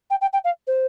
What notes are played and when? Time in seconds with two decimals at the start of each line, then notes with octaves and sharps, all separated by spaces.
0.11 G5
0.21 G5
0.33 G5
0.45 F5
0.67 C5